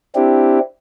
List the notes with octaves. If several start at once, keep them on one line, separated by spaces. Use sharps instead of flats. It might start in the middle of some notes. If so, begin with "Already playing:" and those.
C4 D4 E4 G4